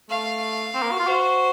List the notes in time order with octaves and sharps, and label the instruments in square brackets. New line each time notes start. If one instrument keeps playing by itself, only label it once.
[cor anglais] A3 [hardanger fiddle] F5
[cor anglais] C4
A#3
F#4
F4
[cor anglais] F#4 [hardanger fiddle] C5